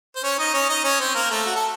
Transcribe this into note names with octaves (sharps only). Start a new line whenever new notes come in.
C5
C#4 C#5
D#4 D#5
C#4 C#5
D#4 D#5
C#4 C#5
C4 C5
A#3 A#4
A3 A4
F#4
A4